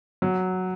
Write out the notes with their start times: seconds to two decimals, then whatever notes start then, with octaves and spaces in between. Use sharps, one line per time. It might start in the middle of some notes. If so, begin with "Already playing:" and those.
0.22 F#3